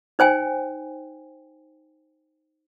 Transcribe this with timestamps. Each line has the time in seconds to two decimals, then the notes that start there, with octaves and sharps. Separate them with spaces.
0.19 D#4 C5 G5 G#5